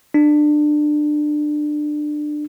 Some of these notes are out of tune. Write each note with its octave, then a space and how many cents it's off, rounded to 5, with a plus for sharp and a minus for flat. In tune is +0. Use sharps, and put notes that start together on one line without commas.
D4 +25